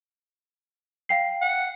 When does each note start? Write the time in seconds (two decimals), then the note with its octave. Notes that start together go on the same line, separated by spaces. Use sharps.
1.09 F5 G5 C7
1.42 F#5